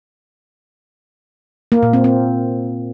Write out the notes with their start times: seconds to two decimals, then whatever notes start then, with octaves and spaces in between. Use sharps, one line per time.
1.72 A#3
1.83 A#2
1.93 C4
2.04 C4